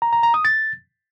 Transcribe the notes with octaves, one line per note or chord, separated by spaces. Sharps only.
A#5
A#5
A#5
D#6
A6